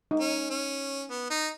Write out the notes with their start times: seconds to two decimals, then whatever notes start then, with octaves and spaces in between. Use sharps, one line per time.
0.11 D#4
0.20 C#4
0.50 C#4
1.10 B3
1.30 D#4